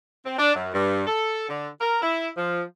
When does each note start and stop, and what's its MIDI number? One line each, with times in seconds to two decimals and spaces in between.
0.25 0.34 60
0.37 0.55 62
0.55 0.73 42
0.73 1.02 43
1.06 1.48 69
1.49 1.68 50
1.81 2.02 70
2.02 2.28 64
2.37 2.62 53